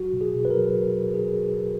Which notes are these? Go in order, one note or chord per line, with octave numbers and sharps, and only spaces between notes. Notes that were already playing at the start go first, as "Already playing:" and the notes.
Already playing: F#3 F#4
B2
G#4
B2
B4
A#4
F#3
F#3
B2
G#4